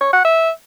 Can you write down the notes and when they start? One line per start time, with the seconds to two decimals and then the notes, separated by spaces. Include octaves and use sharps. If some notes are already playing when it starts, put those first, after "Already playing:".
0.01 C#5
0.13 F#5
0.25 E5